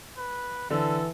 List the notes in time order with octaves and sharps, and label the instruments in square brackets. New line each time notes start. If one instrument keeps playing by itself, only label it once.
[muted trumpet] B4
[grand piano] D3 [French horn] E3 [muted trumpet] A4